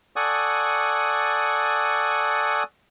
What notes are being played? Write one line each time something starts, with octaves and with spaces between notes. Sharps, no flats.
A4 D5 F#5 G#5 C#6 D#6